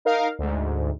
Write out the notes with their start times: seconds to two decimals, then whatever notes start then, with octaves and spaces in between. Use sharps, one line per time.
0.05 D#4 A#4 F5
0.39 D2 G#2